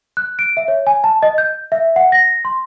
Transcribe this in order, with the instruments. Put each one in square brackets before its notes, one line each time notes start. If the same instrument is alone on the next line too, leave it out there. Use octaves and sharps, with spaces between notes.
[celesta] F#6
D7
E5
C#5
G#5
A5
D#5
G6
E5
F#5
A#6
C6